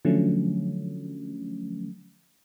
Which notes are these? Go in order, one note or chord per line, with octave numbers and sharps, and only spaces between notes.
D3 F3 F#3 A3 C#4